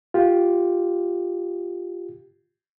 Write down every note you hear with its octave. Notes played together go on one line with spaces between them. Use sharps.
F4 G4